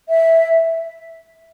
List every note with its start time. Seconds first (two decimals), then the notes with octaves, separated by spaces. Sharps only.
0.09 E5